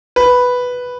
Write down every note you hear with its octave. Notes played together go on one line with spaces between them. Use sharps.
B4